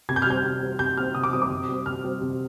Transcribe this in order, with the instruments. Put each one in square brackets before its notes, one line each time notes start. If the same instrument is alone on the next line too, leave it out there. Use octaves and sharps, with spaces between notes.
[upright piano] C3 G#6
G6
F6
G3 C4 G6
C3
G3 C4
C3 G6
G3 C4 F6
C3 D#6
D6
G3 C4 D#6
D6
C3
G3 C4
C3 F6
G3 C4
C3